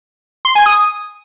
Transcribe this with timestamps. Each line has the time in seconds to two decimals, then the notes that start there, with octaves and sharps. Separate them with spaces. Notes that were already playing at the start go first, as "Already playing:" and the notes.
0.45 C6
0.55 G#5
0.66 D#6